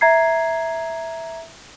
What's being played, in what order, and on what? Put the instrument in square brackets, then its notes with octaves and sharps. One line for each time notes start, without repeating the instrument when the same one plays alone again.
[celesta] E5 A#5 G#6 C7